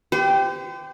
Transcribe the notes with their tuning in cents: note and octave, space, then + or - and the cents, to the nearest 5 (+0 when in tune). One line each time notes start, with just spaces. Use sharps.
G4 +0 C5 -40